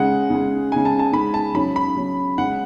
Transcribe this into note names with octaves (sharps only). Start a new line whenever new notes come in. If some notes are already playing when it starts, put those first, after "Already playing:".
Already playing: C#3 G#3 F#5
C#3 G#3
C#3 G#3 G#5
A5
A5
C#3 G#3 B5
A5
C#3 F#3 B5
B5
C#3 F#3
C#3 G#3 F#5